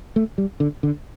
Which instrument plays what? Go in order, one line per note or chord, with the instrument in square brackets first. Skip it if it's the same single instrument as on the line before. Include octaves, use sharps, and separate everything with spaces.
[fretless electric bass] A3
G3
D3
D3